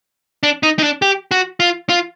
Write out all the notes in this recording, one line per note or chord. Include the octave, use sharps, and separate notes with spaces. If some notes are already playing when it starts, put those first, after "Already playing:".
D4
D#4
D#4
D4
G4
F#4
F4
F4